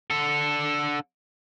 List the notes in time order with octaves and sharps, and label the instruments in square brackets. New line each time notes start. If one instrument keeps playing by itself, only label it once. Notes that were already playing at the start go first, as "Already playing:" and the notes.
[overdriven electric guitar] D3 A4